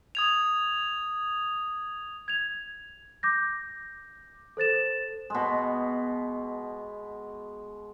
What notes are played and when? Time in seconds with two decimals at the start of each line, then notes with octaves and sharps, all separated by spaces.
0.15 D#6 G#6 F7
2.28 G#6 F7
3.23 D6 G6 A#6
4.57 A4 C5 A6 E7
5.30 B2 G#3